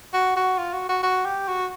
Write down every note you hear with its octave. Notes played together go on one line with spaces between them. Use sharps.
F#4
F#4
F4
F#4
F#4
F#4
G4
F#4